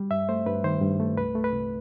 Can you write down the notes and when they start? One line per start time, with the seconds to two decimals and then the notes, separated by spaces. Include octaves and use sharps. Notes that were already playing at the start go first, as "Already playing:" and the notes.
Already playing: G3
0.11 G2 E5
0.29 A3 C5
0.46 G2 B4
0.64 D#3 C5
0.82 G2
1.00 A3
1.18 C2 B4
1.35 A3
1.44 B4
1.53 C2